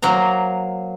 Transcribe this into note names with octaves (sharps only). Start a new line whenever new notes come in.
F#3 A#3 C5 A#5